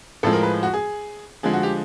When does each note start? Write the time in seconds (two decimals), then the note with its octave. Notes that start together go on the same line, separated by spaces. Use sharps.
0.23 A2 F3 G#3 A4
0.33 A#4
0.43 B4
0.63 F#4
0.73 G#4
1.43 D3 F3 G#3 G#4
1.53 F#4
1.63 G4